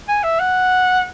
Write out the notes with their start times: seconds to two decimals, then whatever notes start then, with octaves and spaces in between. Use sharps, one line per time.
0.09 G#5
0.24 E5
0.39 F#5